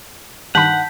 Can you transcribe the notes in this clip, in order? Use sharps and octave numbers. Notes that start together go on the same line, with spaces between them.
G2 D#3 F#5 A5 B5 G6 B6